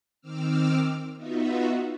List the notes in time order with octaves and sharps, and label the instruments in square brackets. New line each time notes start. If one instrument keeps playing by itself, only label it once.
[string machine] D#3 C4 D6 E6 F6
B3 D#4 F4 F#4 E5